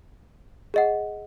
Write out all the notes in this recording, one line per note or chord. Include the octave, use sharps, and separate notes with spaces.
G#4 D#5 F#5